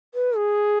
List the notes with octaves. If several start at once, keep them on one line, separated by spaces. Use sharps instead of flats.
B4
G#4